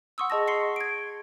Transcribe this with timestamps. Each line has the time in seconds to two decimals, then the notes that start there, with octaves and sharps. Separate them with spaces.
0.18 F#5 C6 C#6 D#6 E6
0.30 G#4 D#5 A5 A#6
0.47 C6 C#6 C7 C#7
0.76 G#6 D7